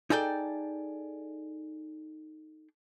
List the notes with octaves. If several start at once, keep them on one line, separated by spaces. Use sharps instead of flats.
D#4 E4 G#4 A4 D5 G5